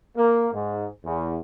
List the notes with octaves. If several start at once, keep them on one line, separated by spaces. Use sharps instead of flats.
A#3
G#2
E2